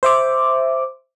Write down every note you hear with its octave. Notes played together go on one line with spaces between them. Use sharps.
C5 E5 D6